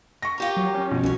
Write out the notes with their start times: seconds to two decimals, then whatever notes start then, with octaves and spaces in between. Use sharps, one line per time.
0.22 C#6 A#6
0.38 F4 G4 A#4
0.57 F#3
0.74 C#4
0.91 B2 F3
1.03 C2 D#3 C#4 F#4